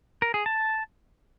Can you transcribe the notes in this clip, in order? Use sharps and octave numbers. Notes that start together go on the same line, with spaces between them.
A#4
G#4
A5